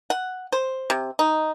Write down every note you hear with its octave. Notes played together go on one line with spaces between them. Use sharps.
F#5
C5
C3
D#4